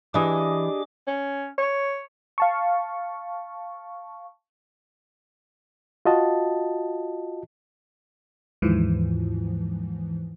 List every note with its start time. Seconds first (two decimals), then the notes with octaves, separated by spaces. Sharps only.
0.14 E3 D4 G4 G#4 D#5 E5 D6
1.07 C#4
1.58 C#5
2.38 F5 A5 C#6
6.05 F4 F#4 D#5 A5
8.62 D#2 G#2 E3 F3